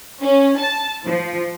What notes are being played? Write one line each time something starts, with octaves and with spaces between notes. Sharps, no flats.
C#4
A5
F3